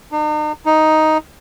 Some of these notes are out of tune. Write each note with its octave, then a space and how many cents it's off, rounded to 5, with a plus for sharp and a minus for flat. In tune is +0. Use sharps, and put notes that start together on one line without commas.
D#4 -45
D#4 +5